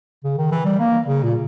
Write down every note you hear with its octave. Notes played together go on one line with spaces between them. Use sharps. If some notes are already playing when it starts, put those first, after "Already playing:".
C#3
D#3
E3
G3
A#3
C#3
A#2